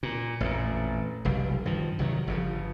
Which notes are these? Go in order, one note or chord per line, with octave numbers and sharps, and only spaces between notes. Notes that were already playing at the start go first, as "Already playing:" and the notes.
A#2
A1 F2 A#2
F1 B1 G3
G2 D#3 F3
C2 D#3 F3 F#3
G1 C#3 F3